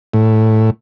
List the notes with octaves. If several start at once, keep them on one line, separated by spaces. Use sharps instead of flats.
A2